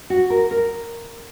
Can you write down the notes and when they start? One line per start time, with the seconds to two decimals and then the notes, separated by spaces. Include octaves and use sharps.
0.10 F#4
0.30 A#4
0.51 A#4